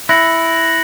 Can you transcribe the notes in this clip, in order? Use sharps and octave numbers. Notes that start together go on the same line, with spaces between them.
E4 F#6 A#6 C#7 F#7